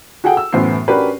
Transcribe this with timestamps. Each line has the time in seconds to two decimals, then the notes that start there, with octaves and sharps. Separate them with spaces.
0.24 F#4 G#4 A4 F#5 G5
0.37 E6
0.53 F#2 A2 E3 B3 C5 C7
0.88 C#4 D4 F#4 G4 A#4 B4